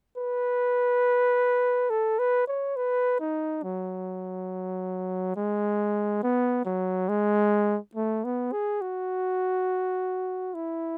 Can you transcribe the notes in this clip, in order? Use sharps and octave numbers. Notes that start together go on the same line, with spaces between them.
B4
A4
B4
C#5
B4
D#4
F#3
G#3
B3
F#3
G#3
A3
B3
G#4
F#4
E4